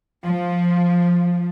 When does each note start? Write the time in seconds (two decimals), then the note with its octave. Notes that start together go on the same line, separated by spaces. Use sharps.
0.24 F3